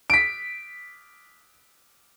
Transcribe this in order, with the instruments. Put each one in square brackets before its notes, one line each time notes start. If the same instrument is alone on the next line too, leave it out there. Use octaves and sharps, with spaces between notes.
[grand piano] B6 D7